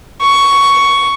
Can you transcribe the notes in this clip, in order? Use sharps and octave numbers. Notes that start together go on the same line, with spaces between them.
C#6